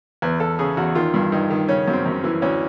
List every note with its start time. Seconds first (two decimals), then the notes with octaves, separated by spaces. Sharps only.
0.22 E2 B4
0.40 E2 A4
0.59 C#3 G#4
0.77 E2 F#4
0.95 D#3 F4
1.14 G2
1.32 G2 D#4
1.50 D#3
1.68 C#3 C#4
1.88 F#2
1.93 C4
2.06 F#2
2.24 E3
2.42 D2 C#4